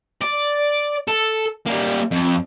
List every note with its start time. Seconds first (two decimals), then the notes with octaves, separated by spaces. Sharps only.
0.21 D5
1.08 A4
1.66 G3 A#3
2.11 F2